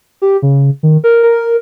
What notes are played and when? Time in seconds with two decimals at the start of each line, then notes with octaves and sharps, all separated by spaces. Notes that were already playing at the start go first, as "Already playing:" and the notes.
0.22 G4
0.42 C#3
0.83 D#3
1.04 A#4
1.23 A#4